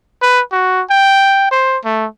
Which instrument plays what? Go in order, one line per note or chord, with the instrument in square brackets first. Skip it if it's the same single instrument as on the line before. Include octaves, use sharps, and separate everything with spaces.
[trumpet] B4
F#4
G5
C5
A3